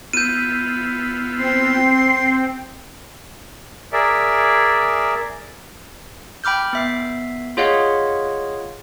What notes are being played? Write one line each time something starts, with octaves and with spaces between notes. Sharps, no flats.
B3 E4 F4 G6 D#7
C4 G5 C6
G#4 A#4 D5 E5
G5 B5 D6 F6 G6
B3 E5 C7
F4 G#4 C#5 D#5 F5 F#5